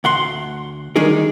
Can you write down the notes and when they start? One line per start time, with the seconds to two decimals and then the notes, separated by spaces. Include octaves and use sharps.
0.04 D2 F#5 C6
0.96 D#3 G3 D4 D#4 G#4 A#4